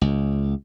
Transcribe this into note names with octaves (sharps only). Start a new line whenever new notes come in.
C#2